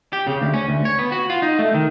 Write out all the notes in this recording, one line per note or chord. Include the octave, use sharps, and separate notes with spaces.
G4
C#3
D2
C#4
D2
C#5
B3
F#4
F4
D#4
A3
D#3